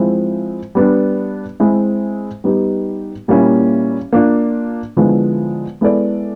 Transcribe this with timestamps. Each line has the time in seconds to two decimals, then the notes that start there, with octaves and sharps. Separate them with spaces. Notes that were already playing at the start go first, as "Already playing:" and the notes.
Already playing: F3 G#3 C4 E4
0.75 G3 B3 D4
1.60 G#3 C4 E4 G#4
2.44 G3 B3 D#4 G4
3.28 A#2 G3 A#3 C#4 E4
4.13 A#3 D4 F4
4.97 D3 F3 G#3 B3 E4
5.81 G#3 B3 E4 A4 D5